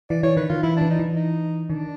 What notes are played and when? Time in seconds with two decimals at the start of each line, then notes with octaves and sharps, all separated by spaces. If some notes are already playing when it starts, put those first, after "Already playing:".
0.10 E3 D5
0.23 E3 C#5
0.37 D#3 B4
0.49 D#3 F4
0.63 E3 E4
0.77 E3 D4
0.90 D#4
0.99 E3
1.16 D#4
1.69 D#3 D4